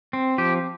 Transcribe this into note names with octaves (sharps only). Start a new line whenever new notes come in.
C4
F3 G4